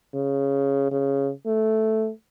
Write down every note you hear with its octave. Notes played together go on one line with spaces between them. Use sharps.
C#3
C#3
A3